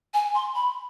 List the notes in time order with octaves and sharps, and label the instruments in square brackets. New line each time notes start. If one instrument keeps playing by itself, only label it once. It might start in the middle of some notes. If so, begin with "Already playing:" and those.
[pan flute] G#5
C6
B5